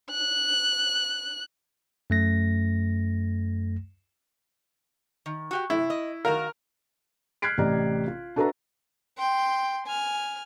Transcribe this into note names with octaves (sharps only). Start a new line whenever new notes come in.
F#6
F#2 A3 A#6
D#3
F#4 G4 F#5
C3 E4
D#5
D#3 F#4 A#4 F5
F6 F#6 G#6 B6 C7 D7
A1 A2 C3 D5 D#5 A#5
F4
D4 F#4 A4 B4 E5 A#5
G5 C6
G#5 F6